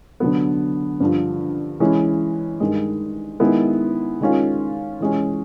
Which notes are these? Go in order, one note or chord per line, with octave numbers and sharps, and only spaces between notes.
D3 F#3 B3
G2 D3 F3
E3 G#3 C#4 E4
G2 D#3 G#3
D#3 G#3 B3 E4
D#3 G#3 C#4 F4
E3 G#3 C#4